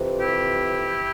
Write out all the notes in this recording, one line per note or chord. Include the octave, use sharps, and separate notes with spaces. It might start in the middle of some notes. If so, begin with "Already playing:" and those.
Already playing: F2 C3 E3
E4 G4